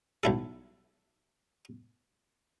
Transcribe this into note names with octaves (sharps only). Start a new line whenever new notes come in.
B1 E4 A4